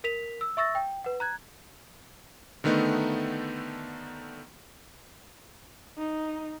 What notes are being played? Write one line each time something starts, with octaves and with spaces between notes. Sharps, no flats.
A#4 B6 F7
E6
E5 C#6 E6 A6 A#6
G5
B4 F#5
A#5 F#6 G#6
D3 D#3 A3 B3 D#4
D#4